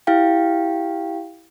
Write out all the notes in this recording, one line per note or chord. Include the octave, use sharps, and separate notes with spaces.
E4 G4 F5 G5